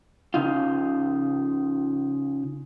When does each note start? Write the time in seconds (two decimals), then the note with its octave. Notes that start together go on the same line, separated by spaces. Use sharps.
0.34 C#3 D#4 F4